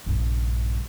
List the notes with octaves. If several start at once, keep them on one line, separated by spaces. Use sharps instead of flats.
A#1 G2